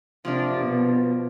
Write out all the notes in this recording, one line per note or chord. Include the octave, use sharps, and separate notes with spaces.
C3 F3 A#3 D4
B2